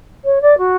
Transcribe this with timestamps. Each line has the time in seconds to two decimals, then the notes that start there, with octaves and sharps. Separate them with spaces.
0.24 C#5
0.41 D5
0.58 F#4